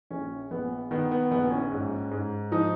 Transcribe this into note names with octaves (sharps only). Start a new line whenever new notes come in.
A#1 C#4
A#1 B3
D#3 B3
B3
A#1 B3
C#4
G#2
G#2
F3 D#4